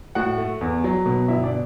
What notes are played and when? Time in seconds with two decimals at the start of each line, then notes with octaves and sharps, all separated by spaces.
0.15 A2 F#4 F#5
0.38 A3
0.61 E2
0.84 F#3
1.06 B2
1.28 G1 E4 E5
1.44 D4 D5